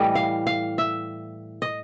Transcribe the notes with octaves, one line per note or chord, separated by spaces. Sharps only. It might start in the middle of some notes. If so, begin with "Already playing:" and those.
Already playing: A2 E3 G3 D#5
F5
F5
E5
D#5